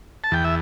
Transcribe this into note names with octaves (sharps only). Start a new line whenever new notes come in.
A5
E2 G5
E5